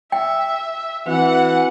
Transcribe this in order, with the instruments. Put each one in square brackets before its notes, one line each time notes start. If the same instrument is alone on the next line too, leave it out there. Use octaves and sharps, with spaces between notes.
[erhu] E5 [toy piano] G5
[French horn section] E3 [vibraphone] C4 F#4 [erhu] F#5